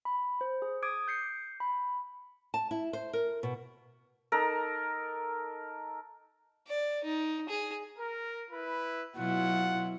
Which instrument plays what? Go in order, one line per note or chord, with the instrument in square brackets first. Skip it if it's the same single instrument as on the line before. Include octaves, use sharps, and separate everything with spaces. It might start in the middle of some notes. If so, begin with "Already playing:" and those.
[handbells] B5
C5
G#4
D6 D#6 G#6 D7
G6 C7 C#7
B5
[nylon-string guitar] A5
E4
C5
A#4
B2
[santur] D#4 A4 A#4
[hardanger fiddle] D5
D#4
G#4
[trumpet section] A#4
E4 B4
[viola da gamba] B2 F#3 E4 [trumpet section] F4 F#5